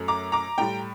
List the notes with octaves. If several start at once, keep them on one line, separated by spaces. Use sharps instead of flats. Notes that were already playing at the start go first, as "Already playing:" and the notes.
Already playing: F#2 F#3 A3
A#5 D6
A#5 D6
A2 G3 G5 A#5